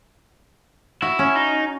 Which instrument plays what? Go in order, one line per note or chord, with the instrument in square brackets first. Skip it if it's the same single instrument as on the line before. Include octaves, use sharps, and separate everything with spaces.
[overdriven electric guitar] E4 [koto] F#4
[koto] C#4
[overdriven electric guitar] D#4